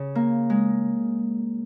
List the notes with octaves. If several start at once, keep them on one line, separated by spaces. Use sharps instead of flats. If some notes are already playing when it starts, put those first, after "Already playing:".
Already playing: C#3
A#3
G#3